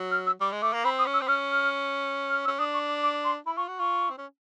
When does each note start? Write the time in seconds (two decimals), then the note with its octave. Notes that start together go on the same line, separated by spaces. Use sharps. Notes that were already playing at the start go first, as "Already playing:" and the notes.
Already playing: F#3
0.11 F6
0.27 E6
0.40 G3 D6
0.52 G#3
0.62 A3 D6
0.73 A#3
0.85 C4 B5
0.99 D#6
1.06 C#4
1.14 E6
1.22 C4
1.28 C#4 F6
1.50 F6
2.30 F6
2.45 E6
2.48 C#4
2.59 D4 D#6
2.74 C#6
2.88 D6
3.03 D6
3.24 C6
3.46 E4 B5
3.57 F4 C#6
3.68 F#4
3.79 F4 C#6
4.10 C4
4.18 C#4